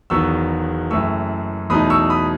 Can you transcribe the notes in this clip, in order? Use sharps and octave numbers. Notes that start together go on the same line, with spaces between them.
E1 E2 D#3 F#3 B3 C#6 E6
F#1 F#2 E3 A3 C#6 E6
E2 B2 F#3 A3 D#4 B5 D#6
C#6 E6
B5 D#6